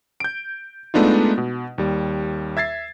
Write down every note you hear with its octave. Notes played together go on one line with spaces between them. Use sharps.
G6 D7
G#3 A3 B3 D4 D#4 F4
B2
D#2 G3
E5 G#6 A6 C7